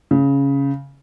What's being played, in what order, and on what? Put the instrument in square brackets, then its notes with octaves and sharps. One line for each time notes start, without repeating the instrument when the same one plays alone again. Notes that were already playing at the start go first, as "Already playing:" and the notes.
[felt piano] C#3